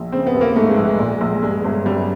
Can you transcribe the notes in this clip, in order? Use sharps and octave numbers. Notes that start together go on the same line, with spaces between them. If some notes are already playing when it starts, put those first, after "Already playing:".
Already playing: A#1
C#3 C4
B3
D#2
A#3
G#2 A3
G#3
A#1
G#3
A#2 G#3
A#1
G2 G#3
G1
F#2 G3